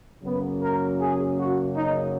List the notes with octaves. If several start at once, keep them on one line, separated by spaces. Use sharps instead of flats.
F#2 C#3 F#3 A#3 B3
A#4
G#4
F#4
D#4